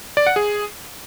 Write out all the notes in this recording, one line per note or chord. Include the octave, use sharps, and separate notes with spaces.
D5
F#5
G#4